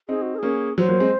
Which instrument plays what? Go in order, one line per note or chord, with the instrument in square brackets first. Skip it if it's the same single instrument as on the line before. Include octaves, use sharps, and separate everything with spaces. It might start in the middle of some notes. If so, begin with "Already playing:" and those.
[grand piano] C4 D#4 [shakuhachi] G#4
[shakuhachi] F#4
A#4
[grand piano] A#3 C#4 [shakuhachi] G#4
[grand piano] F#3 [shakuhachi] C5
[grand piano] F#3 A#3
G#3 C4